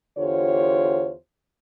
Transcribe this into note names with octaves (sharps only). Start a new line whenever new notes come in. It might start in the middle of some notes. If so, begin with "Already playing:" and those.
E2 D3 F4 G4 C5 C#5